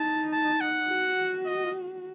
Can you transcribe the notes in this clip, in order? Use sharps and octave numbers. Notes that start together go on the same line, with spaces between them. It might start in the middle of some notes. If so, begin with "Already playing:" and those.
Already playing: D#4 A5
A5
F#5
F#4
D#5